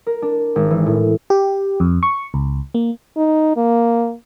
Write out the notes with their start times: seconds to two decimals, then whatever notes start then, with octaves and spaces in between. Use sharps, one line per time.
0.07 A#4
0.22 D4
0.56 G#1
0.71 E3
0.86 A2
1.30 G4
1.80 F2
2.03 C#6
2.34 C#2
2.74 A#3
3.17 D#4
3.56 A#3